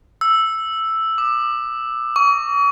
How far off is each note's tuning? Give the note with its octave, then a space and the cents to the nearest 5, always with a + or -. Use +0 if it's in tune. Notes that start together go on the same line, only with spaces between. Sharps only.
E6 +0
D6 +30
C#6 +40